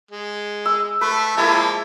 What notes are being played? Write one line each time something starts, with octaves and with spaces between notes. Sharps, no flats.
G#3
E6
A3 B4
F3 G#3 A#3 E4 A5